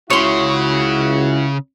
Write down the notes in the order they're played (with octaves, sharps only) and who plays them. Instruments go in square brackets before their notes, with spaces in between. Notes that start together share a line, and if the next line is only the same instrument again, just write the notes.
[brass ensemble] C#2 E4 F#4 [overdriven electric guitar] C#3 [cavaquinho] C#5 C6